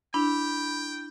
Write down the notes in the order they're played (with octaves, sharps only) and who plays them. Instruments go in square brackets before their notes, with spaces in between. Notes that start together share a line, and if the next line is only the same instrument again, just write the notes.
[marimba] D4 E4 [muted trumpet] G5 [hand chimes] B5